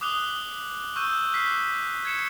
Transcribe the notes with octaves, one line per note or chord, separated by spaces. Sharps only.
D6 D#6 F#6 F7 G7
C#6 E6 F#6 G6 D#7
F6 F#6 B6 C7
G#6 C7 C#7 E7